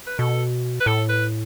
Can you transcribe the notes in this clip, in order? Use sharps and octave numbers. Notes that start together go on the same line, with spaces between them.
B4
B2 A4
B4
A2 A4
B4